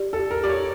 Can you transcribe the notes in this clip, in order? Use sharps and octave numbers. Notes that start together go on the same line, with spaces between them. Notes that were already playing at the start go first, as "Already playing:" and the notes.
Already playing: G4 D5
A4
G4
A#4
G4 D5
C#5